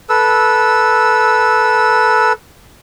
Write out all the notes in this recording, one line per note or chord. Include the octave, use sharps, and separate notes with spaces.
A4 B4 E6